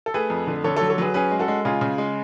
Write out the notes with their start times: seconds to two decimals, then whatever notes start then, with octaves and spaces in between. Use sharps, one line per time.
0.06 A4
0.14 A3 G#4 B4
0.30 F2
0.47 D3
0.64 D3 A4 C#5
0.76 A4 C#5
0.81 F#3
0.90 A4 C#5
0.98 F#3 G#4 B4
1.14 C#4 G#4 B4
1.31 G#3
1.39 F#4 A4
1.48 G#3
1.65 C#3 F4 G#4
1.81 C#3
1.98 G#3